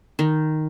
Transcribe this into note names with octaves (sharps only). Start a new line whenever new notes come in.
D#3